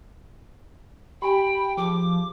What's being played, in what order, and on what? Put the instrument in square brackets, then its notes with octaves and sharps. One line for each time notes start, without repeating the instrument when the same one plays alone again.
[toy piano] G4 G#5 [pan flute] G5 [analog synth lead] B5
[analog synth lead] F3 [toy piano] G#4 [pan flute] D6